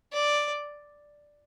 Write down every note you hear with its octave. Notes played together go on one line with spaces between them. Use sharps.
D5